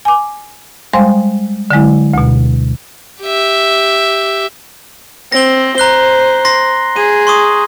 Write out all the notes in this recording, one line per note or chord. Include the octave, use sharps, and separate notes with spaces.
G#5 D6
G3 G#3 C5 F5 C6
D3 F#3 G#3 E4
D2 B2
G4 E5
C4 A#6 G7
C5 A#5 F#6 G7
C6 A#6 C7
G#4 D#7
C6 C#6 D#6